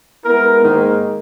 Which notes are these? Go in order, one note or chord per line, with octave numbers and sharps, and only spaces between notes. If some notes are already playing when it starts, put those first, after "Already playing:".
G#3 B3 E4 A#4
G#2 D#3 A#3